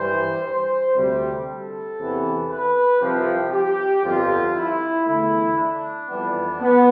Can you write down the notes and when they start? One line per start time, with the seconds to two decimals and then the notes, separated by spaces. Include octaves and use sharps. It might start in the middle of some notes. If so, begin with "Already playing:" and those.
Already playing: G2 E3 G3 C5
0.43 C5
0.95 D2 C3 G3
1.47 A4
1.98 E2 C3 E3 B3
2.49 B4
3.00 C2 C3 F3 G4
3.52 G4
4.04 G1 F2 D3 F4
4.55 E4
5.05 E2 D3 A3 E4
5.57 D4
6.09 F2 E3 G3 B3
6.61 B3